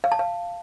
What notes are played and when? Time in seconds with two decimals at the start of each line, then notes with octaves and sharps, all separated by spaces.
0.04 F5
0.12 A5
0.19 F5